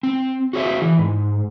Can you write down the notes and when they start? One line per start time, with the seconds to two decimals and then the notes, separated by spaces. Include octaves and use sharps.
0.03 C4
0.53 F#4 G#4 C#5 E5
0.82 E3
0.98 G#2